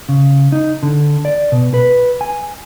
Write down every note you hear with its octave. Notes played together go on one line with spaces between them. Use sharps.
C#3
D#4
D3
D5
B2
B4
G#5